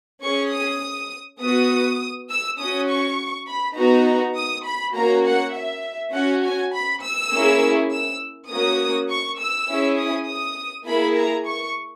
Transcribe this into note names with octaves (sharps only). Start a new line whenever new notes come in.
C#4 G#4 C#6
D#6
B3 F#4 D#6
E6
C#4 F#4 D#6
C#6
B5
B3 D#4 F#4 A#5
D#6
B5
A#3 C#4 F#4 A#5
F#5
E5
C#4 F#4 F#5
G#5
B5
E6
A#3 C#4 E4 G#4
E6
A#3 C#4 F#4 D#6
C#6
E6
C#4 E4 G#4
D#6
D#6
A#3 E4 G#4 B5
A#5
C#6